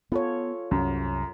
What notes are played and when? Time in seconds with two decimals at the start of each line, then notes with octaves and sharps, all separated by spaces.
0.12 B3 F4 A4 C#5
0.71 C2 F#2